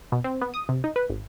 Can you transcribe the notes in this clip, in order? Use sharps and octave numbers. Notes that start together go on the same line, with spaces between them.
B2
C4
B3
D#6
C3
D#4
B4
G#1